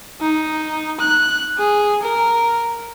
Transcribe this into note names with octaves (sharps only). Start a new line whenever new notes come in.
D#4
F#6
G#4
A#4